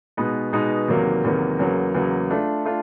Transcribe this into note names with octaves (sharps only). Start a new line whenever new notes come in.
B2 G#3 B3 D#4
B2 G#3 B3 D#4
E2 C3 D#3 F#3 A#3
E2 C3 D#3 F#3 A#3
E2 C#3 F#3 A#3
E2 C#3 F#3 A#3
A3 D4 F4
A3 D4 F4